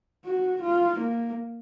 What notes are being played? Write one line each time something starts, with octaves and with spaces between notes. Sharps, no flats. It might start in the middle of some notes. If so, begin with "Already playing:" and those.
F#4
F4
A#3